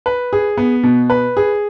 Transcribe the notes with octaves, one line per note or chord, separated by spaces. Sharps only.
B4
G#4
B3
B2
B4
G#4